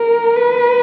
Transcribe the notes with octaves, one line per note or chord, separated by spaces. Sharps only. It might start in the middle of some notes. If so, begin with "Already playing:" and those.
Already playing: A#4
B4